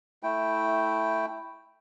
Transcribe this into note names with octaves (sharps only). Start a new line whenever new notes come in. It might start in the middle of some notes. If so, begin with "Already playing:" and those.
A3 E4 G5